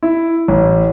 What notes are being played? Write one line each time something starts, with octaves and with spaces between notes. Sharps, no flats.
E4
A1